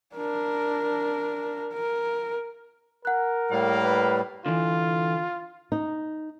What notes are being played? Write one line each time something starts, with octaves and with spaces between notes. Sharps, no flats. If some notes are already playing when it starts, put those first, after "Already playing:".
D4 A#4
A#4
A#4 F#5 F#6
A2 G3 A#3 F5
B4
D3 E3 F4
D#4